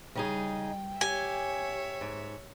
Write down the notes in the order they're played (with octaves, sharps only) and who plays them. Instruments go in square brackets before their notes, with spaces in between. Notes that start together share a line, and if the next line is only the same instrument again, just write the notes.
[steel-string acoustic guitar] C#3 D#4 G#4 [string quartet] G3 [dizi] G5
[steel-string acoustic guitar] G4 [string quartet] C#5 E5 [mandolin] G#5
[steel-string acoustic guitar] G#2